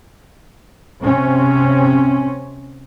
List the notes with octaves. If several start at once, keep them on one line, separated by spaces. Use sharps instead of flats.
C3 C4 C#4